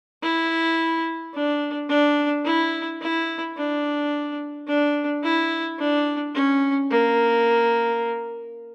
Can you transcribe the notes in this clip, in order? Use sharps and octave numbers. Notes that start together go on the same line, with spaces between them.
E4
D4
D4
E4
E4
D4
D4
E4
D4
C#4
A#3